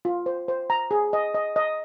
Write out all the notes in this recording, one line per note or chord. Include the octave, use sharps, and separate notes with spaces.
F4
C5
C5
A#5
G#4
D#5
D#5
D#5